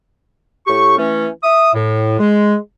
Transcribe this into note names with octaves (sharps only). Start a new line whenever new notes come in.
A2 G4 C#6
E3 A3 C#4
E5 D#6
A2
G#3